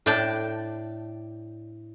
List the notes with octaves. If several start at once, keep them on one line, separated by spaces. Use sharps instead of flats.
A2 D4 D5 G5 A5